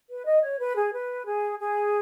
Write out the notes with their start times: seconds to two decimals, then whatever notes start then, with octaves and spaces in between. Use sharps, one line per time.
0.10 B4
0.26 D#5
0.43 C#5
0.60 B4
0.76 G#4
0.92 B4
1.26 G#4
1.59 G#4